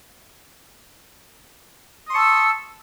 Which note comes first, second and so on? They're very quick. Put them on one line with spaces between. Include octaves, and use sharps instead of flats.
D#6 C6 C#6 A5 E6